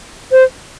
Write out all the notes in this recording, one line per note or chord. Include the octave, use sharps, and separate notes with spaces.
C5